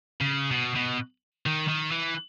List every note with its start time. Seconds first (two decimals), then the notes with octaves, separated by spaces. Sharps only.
0.21 C#3
0.52 B2
0.75 B2
1.46 D#3
1.69 D#3
1.92 E3